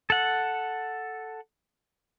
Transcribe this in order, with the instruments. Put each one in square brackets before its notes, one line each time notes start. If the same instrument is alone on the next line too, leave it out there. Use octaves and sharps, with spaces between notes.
[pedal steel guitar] A4 F#5